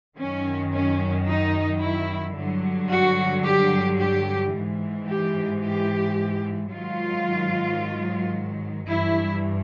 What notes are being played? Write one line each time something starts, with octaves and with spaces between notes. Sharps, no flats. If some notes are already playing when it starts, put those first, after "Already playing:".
F#2 D#3 F#3 C#4
C#4
D#4
E4
G2 D3 F#3
F#4
G4
G4
G#2 E3
G4
G4
G#2 D#3 F#3 F4
G2 E3 E4